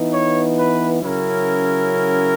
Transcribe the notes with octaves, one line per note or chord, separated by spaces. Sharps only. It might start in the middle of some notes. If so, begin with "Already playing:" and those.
Already playing: E3 B3 D#4
C#5
B4
C#3 F#3 C#4 E4 A#4